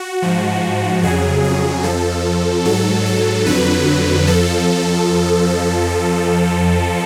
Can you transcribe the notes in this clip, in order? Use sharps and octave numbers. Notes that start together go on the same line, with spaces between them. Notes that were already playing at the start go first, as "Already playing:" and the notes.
Already playing: F#4
G#2 F3
F2 C#3 F#3 G#4
G#4
F2 F3 A4
G#2 F#3 A4
A4
F2 D3 F#3 B4
F2 F3 A4